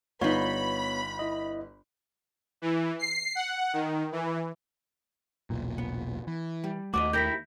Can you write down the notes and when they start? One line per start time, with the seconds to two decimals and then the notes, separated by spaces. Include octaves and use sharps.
0.21 G1 B3 D#4 F4 C#5 B5
1.19 E4 D#5
2.62 E3
2.99 C7
3.35 F#5
3.73 D#3
4.12 E3
5.50 E1 B1 A#2
5.78 B3
6.27 E3
6.64 G3
6.94 D#2 A3 F#4 D5 D#5 D6
7.13 E4 G4 A#4 G6 A#6 B6